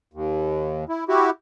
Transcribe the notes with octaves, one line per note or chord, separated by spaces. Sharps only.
D#2
E4
E4 F#4 G4